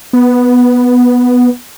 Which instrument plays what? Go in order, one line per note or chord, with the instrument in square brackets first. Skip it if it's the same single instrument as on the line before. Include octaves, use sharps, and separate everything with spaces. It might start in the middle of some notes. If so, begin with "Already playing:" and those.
[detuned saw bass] B3